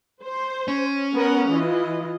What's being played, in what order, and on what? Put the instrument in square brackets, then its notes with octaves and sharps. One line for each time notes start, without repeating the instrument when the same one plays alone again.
[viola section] C5
[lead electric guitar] C#4
[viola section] B3 A#4 F#5
E3 F4 D#5